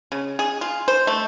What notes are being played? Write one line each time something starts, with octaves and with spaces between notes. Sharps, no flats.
C#3
G#4
F4
C5
A3